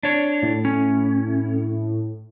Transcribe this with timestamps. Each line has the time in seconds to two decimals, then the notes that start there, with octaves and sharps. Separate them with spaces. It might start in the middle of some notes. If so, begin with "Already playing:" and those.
0.03 D4 C#5
0.42 A2
0.65 C#4